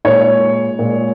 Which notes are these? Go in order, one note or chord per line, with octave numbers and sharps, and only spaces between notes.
A#2 G#3 C#5
A#2 G#3